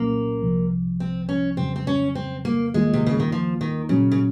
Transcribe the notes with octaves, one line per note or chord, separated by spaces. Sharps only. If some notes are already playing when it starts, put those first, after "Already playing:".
Already playing: C2 A#2 F#3 A#3 C#4
C2 C3 F3
C4
C#4
F2 C#3 F#3 C4
C4
C#4
C4
A#3
D#2 D#3 G#3 A#3 F4
C3
C#3
D#3
F3
D#3
A#2 C#3 F#3 C#4
C#3